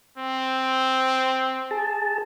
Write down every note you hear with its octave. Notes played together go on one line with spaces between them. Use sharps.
C4
G#4 A5